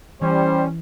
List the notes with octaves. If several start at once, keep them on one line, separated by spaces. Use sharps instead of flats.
E3 G3 C#4 C5